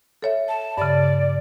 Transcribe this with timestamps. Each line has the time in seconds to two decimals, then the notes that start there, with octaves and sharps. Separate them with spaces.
0.22 A4 C#5 E5
0.48 A5
0.77 G2 C#3 D5